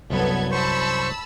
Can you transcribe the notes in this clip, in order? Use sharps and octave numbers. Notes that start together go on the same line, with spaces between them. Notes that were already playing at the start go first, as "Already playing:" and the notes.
C2 F#2 F#3 B3 A4 G#6
C5 A5 B5 C#6 E6